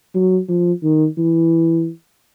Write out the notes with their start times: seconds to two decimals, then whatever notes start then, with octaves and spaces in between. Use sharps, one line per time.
0.15 F#3
0.48 F3
0.83 D#3
1.17 E3